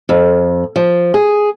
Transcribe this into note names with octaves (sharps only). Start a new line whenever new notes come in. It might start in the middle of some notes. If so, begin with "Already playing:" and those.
F2
F3
G#4